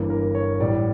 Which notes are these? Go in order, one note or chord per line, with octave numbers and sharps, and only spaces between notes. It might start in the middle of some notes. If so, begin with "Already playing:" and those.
Already playing: G1 G2 E3 A#3
A#4
C#5
A1 A2 G3 D5